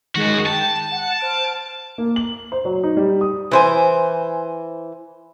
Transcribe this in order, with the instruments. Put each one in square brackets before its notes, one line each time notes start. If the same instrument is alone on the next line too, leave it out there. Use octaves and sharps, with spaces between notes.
[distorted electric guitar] F#2 F#4 [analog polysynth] D#3 G#3 G#4
[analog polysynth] G5 [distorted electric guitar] A5
[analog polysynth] F#5
C5 F6 D7
[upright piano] A#3
F#7
C5
F#3
D#4
G3
D#6
[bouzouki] E3 C5 G#5